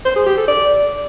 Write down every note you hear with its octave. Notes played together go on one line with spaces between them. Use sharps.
C5
G#4
G4
A4
D5